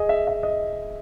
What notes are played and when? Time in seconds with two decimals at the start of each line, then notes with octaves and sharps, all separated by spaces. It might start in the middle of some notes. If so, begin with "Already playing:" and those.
Already playing: G#4 D#5
0.09 E5
0.27 E5
0.43 D#5